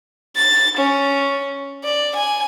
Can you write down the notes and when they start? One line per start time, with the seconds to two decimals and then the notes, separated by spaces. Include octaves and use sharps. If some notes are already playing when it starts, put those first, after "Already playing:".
0.36 A6
0.77 C#4
1.84 D5
2.16 G#5